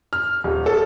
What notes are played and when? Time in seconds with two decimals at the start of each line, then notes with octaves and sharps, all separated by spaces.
0.13 F6
0.44 D#1
0.66 A4